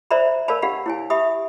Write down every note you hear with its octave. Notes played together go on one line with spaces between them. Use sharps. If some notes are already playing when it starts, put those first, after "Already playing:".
C5 D5 E5 A#5 B5
A#4 C#5 D5 F5 A5 B5
D4 G4 F5 F#5 B5
E4 C#5 G#5
G4 E5 B5 D#6